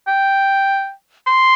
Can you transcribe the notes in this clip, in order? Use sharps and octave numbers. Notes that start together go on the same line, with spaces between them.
G5
C6